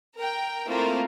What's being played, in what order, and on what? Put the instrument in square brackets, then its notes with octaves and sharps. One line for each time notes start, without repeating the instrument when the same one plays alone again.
[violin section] A#4 G5
A3 A#3 C4 E4 F4 A#4